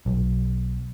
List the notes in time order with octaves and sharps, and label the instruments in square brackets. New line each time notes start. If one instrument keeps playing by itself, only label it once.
[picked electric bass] B1